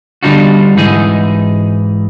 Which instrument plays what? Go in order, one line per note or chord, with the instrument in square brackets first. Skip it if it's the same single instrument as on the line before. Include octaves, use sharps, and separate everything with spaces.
[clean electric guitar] D3 G3 D4 D#4 F4 F#4
G#2 E3 D#4 G#4